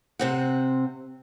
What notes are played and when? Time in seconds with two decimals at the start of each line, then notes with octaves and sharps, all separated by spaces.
0.19 C3 C4 F#5